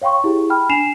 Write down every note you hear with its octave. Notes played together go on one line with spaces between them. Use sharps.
C#5 F5 G5 C6 C#6
E4 G4 G#4
G5 B5 F6
D4 G#5 C7 E7 F7